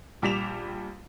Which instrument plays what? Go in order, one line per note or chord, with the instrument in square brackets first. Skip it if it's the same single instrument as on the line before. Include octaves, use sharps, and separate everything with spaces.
[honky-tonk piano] A#1 G3 D6 B6 E7 F7